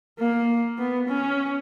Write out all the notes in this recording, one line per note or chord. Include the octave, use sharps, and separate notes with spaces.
A#3
B3
C#4